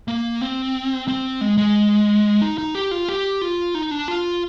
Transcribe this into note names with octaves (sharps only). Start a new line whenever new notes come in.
A#3
C4
C4
G#3
G#3
D#4
D#4
G4
F4
G4
F4
D#4
D4
F4